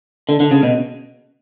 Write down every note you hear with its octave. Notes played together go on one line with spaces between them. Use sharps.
D3
D3
C#3
B2